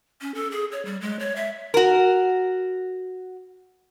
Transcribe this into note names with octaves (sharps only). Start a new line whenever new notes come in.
C#4
A4
G#4
C#5
G3
G#3
C#5
E5
F#4 A#4